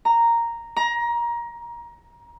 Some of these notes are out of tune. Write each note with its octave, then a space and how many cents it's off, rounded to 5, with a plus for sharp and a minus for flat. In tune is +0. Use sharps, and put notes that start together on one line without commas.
A#5 -5
A#5 +20